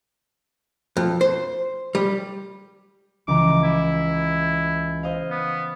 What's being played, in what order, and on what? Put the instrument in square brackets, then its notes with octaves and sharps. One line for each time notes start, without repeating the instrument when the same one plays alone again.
[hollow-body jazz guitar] F2
C5
G3
[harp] C#2 E3 A#5 [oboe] D6
[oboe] E4
[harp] C5 D#5 F5
[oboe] B3